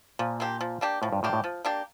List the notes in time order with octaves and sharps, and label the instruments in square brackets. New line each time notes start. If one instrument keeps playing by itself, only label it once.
[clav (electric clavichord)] A#2 [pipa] F3
[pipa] A#3 D4 G4
F3
A#3 D4 G4
[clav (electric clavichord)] A2 [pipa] F3
[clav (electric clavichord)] G2
[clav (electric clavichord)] A2 [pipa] A#3 D4 G4
[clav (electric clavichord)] A2
[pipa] F3
A#3 D4 G4